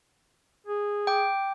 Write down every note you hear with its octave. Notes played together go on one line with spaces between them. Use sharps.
G#4
G5 D6